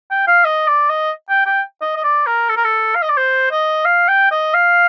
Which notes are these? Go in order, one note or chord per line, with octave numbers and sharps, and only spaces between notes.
G5
F5
D#5
D5
D#5
G5
G5
D#5
D#5
D5
A#4
A4
A#4
A4
F5
D#5
D5
C5
D#5
F5
G5
D#5
F5